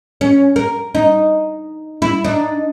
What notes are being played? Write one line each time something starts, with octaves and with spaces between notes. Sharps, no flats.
C#4
A#4
D#4
E4
D4 D#4